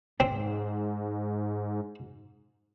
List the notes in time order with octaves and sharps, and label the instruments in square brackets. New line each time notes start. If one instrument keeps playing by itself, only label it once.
[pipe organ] G#2 [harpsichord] C4